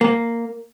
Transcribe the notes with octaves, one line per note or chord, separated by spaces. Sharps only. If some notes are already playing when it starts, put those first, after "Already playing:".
A#3